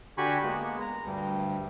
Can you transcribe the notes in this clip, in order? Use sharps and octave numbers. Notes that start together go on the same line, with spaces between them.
D3 F#4 G4 G#5 B5 C#6
G#3 A#3 B3
A#5
D2 G2 G3